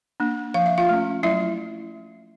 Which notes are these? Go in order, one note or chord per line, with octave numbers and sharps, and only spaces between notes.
A#3 D4
F3 F5
E5
F4 F5
A3 C#4
F#3 E4 E5